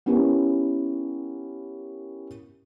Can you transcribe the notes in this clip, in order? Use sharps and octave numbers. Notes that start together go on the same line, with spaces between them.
B3 C#4 E4 G4 A#4